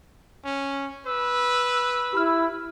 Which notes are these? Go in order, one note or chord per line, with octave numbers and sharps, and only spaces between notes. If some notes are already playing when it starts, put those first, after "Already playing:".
C#4
B4 E6
E4 G4 B5 F6